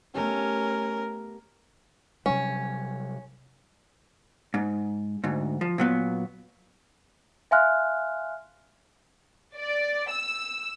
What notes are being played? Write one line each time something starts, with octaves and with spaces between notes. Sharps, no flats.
A3 B3 C#4 G4 A#4
C3 F#3 G3 C#4
G#2
D2 G#2
F3
A#2 F#3 B3
E5 F5 G#5 C6 F6 F#6
D5
E6